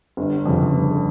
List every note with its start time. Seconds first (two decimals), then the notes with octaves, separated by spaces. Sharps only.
0.17 G1
0.45 F2 C#3
0.74 G1